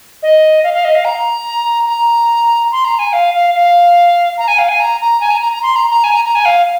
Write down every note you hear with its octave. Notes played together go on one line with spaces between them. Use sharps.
D#5
F5
F5
D#5
F5
A#5
A#5
C6
A#5
G#5
F5
F5
F5
A#5
G#5
F5
G#5
A#5
A#5
G#5
A#5
A#5
A#5
C6
A#5
A#5
G#5
A#5
A#5
G#5
F5